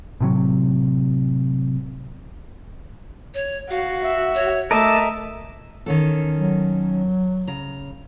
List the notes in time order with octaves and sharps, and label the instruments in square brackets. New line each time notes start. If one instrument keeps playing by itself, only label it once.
[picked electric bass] A2 C3 F#3
[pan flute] C#5
[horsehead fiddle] F#4 [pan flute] F5
[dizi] E5
[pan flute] C#5
[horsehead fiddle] A3 [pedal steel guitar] A#4 D#5 E5 [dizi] A5 [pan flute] D6
[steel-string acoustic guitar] D#3 C#4 A4
[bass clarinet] F#3
[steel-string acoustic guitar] C#3 A#5